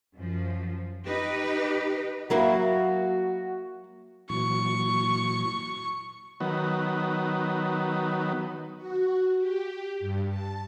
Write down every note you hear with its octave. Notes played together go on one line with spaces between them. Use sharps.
F#2 F3
D#4 G4 B4
F#3 A#3 E4 F#4
A#2 E3 F#3 C#6
D#3 F#3 B3
F#4
G4
G2
A5